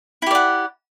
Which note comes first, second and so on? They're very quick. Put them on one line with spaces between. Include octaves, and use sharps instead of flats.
E4 G4 D5 F#5